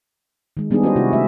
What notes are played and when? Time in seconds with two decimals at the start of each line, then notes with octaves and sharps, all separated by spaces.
0.57 D#3 G#3
0.71 G3 B3 D4 D#4 G#4
0.83 C#4 E4 F#4 G4 C5 D#5
0.96 C3 E4 F#4
1.13 A3 F#4 E5